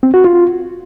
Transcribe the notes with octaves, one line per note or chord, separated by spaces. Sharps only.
C4
F#4
F4